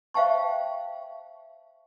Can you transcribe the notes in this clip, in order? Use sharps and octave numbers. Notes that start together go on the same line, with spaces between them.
C5 E5 F5 G5 A5 C#6